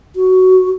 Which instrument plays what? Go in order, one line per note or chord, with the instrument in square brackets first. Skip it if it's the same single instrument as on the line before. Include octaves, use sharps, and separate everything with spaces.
[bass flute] F#4